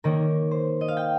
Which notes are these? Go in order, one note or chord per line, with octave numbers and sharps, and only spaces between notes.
D#3 A#3 C#4 A#4
C5
D#5
F5
G5